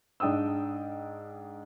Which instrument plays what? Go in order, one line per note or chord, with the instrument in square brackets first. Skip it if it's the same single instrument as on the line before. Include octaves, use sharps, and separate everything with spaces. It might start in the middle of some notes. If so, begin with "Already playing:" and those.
[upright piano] G#2 D4 G5 D#6 E6